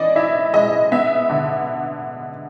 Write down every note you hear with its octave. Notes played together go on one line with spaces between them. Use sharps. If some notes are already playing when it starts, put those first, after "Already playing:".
Already playing: E3 D5 D#5
E4 E5
G#3 D#5
B3 E5
D3